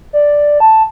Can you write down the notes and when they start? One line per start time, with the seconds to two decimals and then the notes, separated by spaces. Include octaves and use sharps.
0.13 D5
0.60 A5